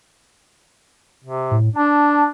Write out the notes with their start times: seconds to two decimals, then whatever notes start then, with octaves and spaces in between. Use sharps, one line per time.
1.24 C3
1.51 A2
1.76 D4 A5